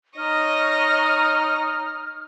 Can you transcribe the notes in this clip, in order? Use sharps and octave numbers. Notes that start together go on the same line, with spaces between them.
D#4 C#5 D#5 F6